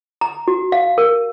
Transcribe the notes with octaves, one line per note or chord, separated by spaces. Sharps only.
A#5
F#4
F5
A#4